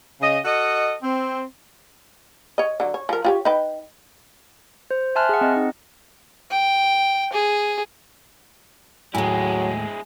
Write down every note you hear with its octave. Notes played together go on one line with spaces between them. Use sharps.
C#3 D#5
F#4 A4 D#5
C4
C#5 D#5
D3 F#3
C#5
F3 A#4
F4 G4 C#5
D#4 B4 G5
C5
E5 G#5 A5 C6 F6 F#6
G#4 F#5
C4 D#5
D#4
G5
G#4
D#2 A2 F#3 G#3 E4 G#5